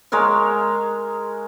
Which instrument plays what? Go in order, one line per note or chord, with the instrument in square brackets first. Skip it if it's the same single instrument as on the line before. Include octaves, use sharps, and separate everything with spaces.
[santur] G#3 A#4 C#5 F5